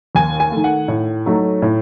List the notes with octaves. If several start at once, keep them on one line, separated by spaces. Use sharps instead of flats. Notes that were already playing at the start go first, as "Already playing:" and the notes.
D#2 G#5
G#5
D#3 A3
F#5
A2
F#3 A3 D#4
A2